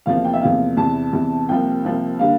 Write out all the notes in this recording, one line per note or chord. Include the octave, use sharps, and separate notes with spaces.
E2 C3 F3 A#3 F5
G5
E5
E2 C3 F3 A#3 F5
E2 C3 E3 A5
E2 C3 E3
C2 C3 F3 A#3 G5
C2 C3 F3 A#3
D3 G3 A#3 F5